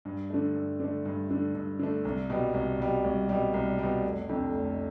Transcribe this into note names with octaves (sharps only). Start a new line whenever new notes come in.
G2
D3 A3
G2
D3 A3
G2
D3 A3
G2
D3 A3
C2
B2 G3
C2
B2 G3
C2
B2 G3
C2
B2 G3
F1
F2 D3 A3
F1